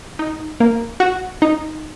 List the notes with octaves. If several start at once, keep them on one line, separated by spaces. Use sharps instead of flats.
D#4
A#3
F#4
D#4